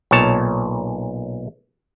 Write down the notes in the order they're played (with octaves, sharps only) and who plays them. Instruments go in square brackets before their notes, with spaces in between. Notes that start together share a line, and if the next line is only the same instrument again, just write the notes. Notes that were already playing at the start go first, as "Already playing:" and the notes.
[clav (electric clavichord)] B1 A#2 C#5 A5